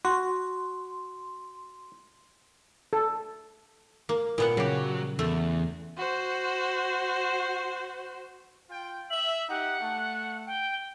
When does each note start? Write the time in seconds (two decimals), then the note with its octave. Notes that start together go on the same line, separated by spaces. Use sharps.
0.05 F#4 C6
2.93 A4
4.09 A#3
4.38 A#2 B3 F#5
4.57 C#3 F#3 G4
5.19 E2 A3
5.97 F#4 C5
8.70 F4 G5
9.11 E5 F#7
9.49 D#4 G4 F#5
9.81 A3
10.47 G5